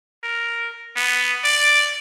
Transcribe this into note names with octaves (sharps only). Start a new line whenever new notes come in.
A#4
B3
D5